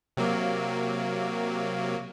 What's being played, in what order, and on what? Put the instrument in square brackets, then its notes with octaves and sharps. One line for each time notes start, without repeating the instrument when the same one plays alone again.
[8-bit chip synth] C3 F#3 A#3